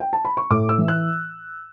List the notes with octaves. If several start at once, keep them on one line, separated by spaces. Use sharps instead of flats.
G5
A5
B5
C#6
A2 D6
E6
E3
F#6